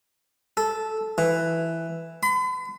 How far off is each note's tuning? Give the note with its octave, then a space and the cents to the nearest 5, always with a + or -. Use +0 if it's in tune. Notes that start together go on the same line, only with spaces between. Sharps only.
A4 -10
E3 +0
B5 +45